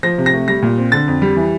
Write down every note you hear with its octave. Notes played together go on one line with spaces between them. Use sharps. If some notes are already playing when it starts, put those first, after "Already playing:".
F3 A#6
C3
A#6
A3
G3 A#6
A#2
C4
D3 A6
F2
G3
E3